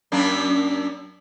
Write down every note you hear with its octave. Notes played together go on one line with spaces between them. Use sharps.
F#2 A#3 D4